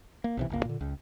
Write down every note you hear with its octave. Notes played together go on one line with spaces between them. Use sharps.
A#3
B1 C3 E3
G1 C#2 A#3
A#2 D3
C#2